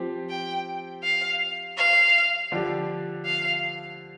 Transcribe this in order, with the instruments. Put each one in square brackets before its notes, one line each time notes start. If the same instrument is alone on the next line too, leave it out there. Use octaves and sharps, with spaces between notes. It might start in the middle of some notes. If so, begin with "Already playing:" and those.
Already playing: [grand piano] F3 C4 G4
[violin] G5
F5
F5
[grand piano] D3 F3 D4 G4
[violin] F5